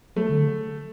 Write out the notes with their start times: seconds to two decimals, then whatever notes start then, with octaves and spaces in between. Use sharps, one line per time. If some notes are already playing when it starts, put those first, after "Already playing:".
0.16 F#3 A3
0.29 D3